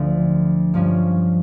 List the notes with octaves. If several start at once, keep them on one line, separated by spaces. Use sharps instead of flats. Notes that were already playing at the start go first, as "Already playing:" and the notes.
Already playing: D2 D3 F3
G2 F3 C#4